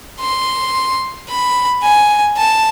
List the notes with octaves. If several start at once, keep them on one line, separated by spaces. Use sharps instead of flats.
C6
B5
G#5
A5